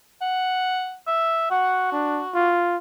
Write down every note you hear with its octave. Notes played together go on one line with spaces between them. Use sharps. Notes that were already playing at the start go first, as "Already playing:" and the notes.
F#5
E5
F#4 F#5
D4
F4